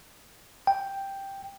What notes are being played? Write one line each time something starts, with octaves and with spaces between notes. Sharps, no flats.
G5